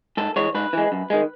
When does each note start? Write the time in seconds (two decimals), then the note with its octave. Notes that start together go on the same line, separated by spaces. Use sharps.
0.17 G#2 A4
0.36 E3 G#3 C#5
0.55 G#2 B4
0.73 E3 G#3
0.92 F#2
1.10 D#3 G#3